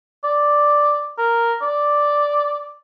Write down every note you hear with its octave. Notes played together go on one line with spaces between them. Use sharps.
D5
A#4
D5